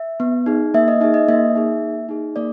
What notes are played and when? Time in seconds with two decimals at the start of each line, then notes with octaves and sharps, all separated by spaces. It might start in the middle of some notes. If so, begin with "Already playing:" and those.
Already playing: E5
0.20 B3
0.46 D#4 G#4
0.74 A#3 E5
0.88 D#5
1.01 D#4 G#4 E5
1.14 D#5
1.28 A#3 E5
1.55 D#4 G#4
1.83 A#3
2.09 D#4 G#4
2.36 A#3 D5